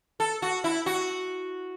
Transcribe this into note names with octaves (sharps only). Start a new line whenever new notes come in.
A4
F#4
E4
F#4